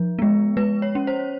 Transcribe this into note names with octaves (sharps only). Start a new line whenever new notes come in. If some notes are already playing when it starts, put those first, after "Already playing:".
Already playing: F3
G#3 B3
G#3 B4
C#5
C#4
C5